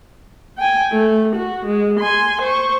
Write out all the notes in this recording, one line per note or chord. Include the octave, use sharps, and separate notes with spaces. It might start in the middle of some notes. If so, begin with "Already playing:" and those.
G5 G#5
A3
F#4
G#3
G#5 C6
C5 C#6